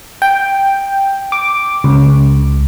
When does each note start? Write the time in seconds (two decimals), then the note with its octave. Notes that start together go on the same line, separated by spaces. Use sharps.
0.22 G5
1.32 D6
1.84 C#2